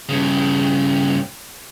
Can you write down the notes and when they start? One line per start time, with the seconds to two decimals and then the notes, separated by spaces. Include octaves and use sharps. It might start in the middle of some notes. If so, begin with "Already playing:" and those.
0.09 G2 C#3